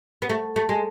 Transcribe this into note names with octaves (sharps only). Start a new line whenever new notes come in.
B3
A3
A3
G#3